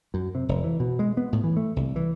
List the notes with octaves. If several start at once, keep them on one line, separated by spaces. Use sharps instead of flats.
F#2
C3
F1
E3
B2
G#3
B3
A2
E3
A3
C2
E3